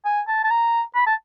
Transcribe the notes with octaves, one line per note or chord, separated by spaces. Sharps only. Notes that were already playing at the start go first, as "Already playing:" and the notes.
G#5
A5
A5
A#5
B5
A5